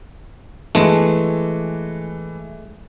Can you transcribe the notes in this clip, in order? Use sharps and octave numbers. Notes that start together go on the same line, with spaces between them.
E3 G#3 A3 B4